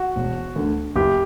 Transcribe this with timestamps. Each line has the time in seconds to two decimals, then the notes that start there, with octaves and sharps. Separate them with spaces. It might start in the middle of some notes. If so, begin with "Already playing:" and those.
Already playing: F#4
0.16 E1
0.56 D2 D3
0.96 F#1 G4